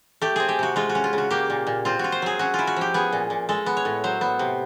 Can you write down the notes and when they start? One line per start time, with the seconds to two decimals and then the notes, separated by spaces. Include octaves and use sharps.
0.21 A3 G4
0.36 C4 G#4
0.49 G4
0.59 C3 F#4
0.76 G#3 F4
0.89 F#4
0.95 C#4
1.04 F4
1.13 C#3
1.18 F#4
1.30 A#3 G4
1.50 A#2
1.67 A#2
1.85 C4 F4
1.99 F4 F#4
2.12 C5
2.22 F#3 G#4
2.39 C#4 F#4
2.54 E4 F4
2.67 F#4
2.76 F3 G4
2.94 B3 G#4
3.12 A#2
3.30 A#2
3.49 G#3 A4
3.66 B3
3.77 C#5
3.85 A2
4.04 F#3 C5
4.21 B3
4.39 C3